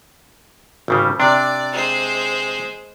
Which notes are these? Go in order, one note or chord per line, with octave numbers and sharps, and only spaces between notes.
G#1 C#3 G3
C3 D4 D5
G#3 C5